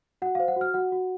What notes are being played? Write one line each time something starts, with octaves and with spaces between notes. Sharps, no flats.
F#4 F#5
C5 F5
F#5
F#4 F6
F#4 F#5
F#4